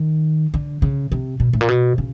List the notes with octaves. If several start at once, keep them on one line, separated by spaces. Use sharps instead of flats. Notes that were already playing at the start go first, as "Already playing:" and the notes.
Already playing: D#3
D3
C#3
C3
B2
A2
A#2
B2
C#3